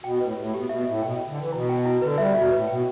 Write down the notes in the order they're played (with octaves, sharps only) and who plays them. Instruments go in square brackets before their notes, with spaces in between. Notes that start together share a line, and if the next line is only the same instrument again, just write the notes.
[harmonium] B2 [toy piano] G5
[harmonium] A2 [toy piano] B4
[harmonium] A2 [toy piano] G4
[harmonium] B2 [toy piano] G4
[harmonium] B2 [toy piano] E5
[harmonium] A2 [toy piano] E5
[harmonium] B2 [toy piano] G5
[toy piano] G5
[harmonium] D3
[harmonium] E3 [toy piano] G5
[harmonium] B2 [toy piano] E4
[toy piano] G5
E4
[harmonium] D3 [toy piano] B4
[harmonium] G3 [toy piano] E5
[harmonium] B2 [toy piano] E5
[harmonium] A2 [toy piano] B4
[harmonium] B2 [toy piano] G5